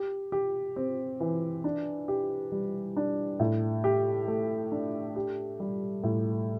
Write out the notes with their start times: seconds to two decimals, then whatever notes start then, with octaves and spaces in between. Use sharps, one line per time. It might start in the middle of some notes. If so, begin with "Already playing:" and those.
Already playing: G4
0.32 G4
0.76 C4
1.20 E3
1.64 D4
2.08 G4
2.52 G3
2.97 D4
3.40 A2
3.84 G4
4.28 A3
4.72 D4
5.16 G4
5.60 G3
6.04 A2